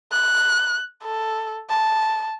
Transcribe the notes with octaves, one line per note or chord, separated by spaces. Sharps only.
F#6
A4
A5